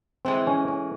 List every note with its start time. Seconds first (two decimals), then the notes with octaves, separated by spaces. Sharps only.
0.25 A2 E3 G#3 C4
0.47 C#4
0.68 C#4